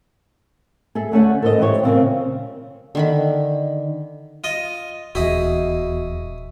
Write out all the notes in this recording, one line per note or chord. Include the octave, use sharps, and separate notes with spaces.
G#4 A4 E5
D2 A3 C#4 F#5
A4 A#4 C5 D5 D#5
E3 E4 G4 C5 C#5
A#2 C#3 E3 C4 A#4 F5
D3 D#3 B5
F4 D#5
D#1 E2 E4 F#4 G#4 D#5